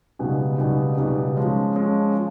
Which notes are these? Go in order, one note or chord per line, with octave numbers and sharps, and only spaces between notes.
C#2 B2 G3 B3 D#4
C#2 B2 G3 B3 D#4
C#2 B2 G3 B3 D#4
F3 G#3 C#4
F3 G#3 C#4
F3